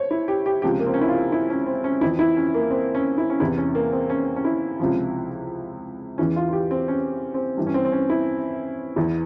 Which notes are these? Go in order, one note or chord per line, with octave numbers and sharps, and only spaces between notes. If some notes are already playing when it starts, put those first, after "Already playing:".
Already playing: C5 C#5
E4
G4
G4
C#2 C3 F3 G4
A#3
C4
C#4
E4
F4
E4
C#4
C4
C#4
F2 E3 E4
E4
C#4
A#3
C4
C#4
E4
C#4
E2 C3 E3 E4
C#4
A#3
C4
C#4
C#4
E4
C#2 C3 F3
E2 E3 C#4
F4
F4
G4
C4
C#4
C4
G2 E3
C#4
C4
C4
C#4
E4
E2 E3 E4